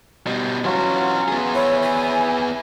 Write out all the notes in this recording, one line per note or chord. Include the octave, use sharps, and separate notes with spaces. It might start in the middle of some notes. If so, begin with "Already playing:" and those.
B2 G3
E3 F#3 C#4 F4 F#4
B3 G#4
E4 C#5
G#5